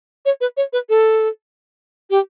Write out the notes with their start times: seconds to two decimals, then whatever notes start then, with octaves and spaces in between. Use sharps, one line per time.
0.25 C#5
0.41 B4
0.57 C#5
0.73 B4
0.89 A4
2.10 G4